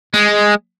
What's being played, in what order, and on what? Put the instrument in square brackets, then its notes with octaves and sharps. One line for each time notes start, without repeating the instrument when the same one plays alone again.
[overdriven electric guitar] G#3